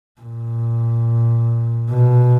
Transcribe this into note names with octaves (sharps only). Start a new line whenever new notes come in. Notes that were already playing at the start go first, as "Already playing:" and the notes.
A#2
B2